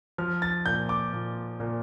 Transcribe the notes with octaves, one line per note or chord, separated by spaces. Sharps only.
F3 F6
A6
A#2 G6
D6
A#2
A#2